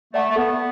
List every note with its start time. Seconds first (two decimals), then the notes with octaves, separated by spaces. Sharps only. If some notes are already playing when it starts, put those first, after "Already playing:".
0.14 A3 D5 F#5 A5 D6
0.30 A3
0.36 B3 A4